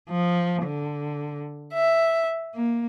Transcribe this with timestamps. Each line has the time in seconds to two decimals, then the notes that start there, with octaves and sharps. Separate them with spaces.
0.11 F3
0.63 D3
1.73 E5
2.54 A#3